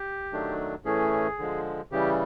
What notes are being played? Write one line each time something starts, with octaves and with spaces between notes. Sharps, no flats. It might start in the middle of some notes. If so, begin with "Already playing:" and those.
Already playing: G4
D#3 F#3 A3 D4
A2 E3 A3 C#4 G#4
D3 F3 G#3
C#3 E3 G3 G4